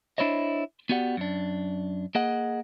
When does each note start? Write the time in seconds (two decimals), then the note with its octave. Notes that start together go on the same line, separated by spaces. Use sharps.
0.18 D4 E4 C5 C#5 D#5
0.89 B3 F#4 G4 D5 F#5
1.17 F#2 D4
2.15 A#3 G#4 D#5 F#5